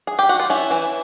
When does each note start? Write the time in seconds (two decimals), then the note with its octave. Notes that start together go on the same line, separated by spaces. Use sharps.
0.07 G#4
0.19 G4
0.29 F#4
0.40 F4
0.50 C#4 E4
0.71 E3